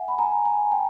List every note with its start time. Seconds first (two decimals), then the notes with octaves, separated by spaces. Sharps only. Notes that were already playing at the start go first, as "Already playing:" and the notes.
Already playing: E5 F#5 G#5
0.08 B5
0.18 G#5 A#5
0.45 G#5 A#5
0.72 G5 A5